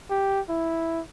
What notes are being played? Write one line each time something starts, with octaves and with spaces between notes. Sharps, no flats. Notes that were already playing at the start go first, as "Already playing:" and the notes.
G4
E4